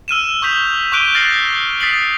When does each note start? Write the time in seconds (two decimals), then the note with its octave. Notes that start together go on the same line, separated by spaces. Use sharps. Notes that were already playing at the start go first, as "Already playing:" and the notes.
0.08 E6 F6 D#7 E7
0.42 C#6 D#6 G6 B6 F7
0.92 C#6 D6 F#6 D7 D#7 G7
1.15 F6 A6 A#6 C7 F#7
1.80 D#6 A6 B6 C7 F7 F#7